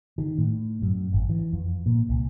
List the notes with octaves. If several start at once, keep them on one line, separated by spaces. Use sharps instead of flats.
D#3
A2
F#2
G#1
E3
F2
A#2
C2